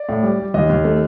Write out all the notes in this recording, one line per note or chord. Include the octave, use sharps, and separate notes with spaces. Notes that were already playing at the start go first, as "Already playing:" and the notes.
Already playing: D5
A2
G3
G3
D#2 D#5
D#2
A3